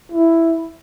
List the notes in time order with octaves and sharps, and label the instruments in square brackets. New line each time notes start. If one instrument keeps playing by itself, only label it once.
[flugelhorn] E4